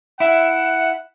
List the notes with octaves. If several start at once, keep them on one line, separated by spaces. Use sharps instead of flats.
E4 E5 F#5